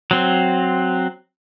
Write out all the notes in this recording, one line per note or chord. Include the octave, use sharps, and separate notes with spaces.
F#3 C4